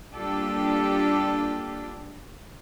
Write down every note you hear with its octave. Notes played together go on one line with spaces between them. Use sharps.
G3 A#3 D4 F4 G4 A4